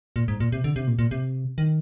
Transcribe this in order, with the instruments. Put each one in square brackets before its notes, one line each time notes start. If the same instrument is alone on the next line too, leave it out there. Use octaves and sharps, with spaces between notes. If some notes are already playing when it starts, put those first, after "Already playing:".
[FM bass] A#2
G#2
A#2
C3
D3
C3
A#2
A#2
C3
D#3